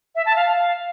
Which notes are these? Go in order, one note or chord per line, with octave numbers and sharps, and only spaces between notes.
E5
A5
F5